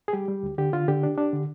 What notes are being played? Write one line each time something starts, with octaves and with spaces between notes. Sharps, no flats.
G#4
G3 G4
G3
D2
D3 G4
D3 F4
D3 G4
D4
D4
D3